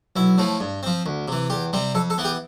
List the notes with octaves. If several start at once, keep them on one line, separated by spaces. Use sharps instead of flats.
B1 E4
A2 F3 A3
G2
F3 C4
D2
C3 E3
E2 G4
C3 G3 C4
F2 A4
A4
E3 B3
G4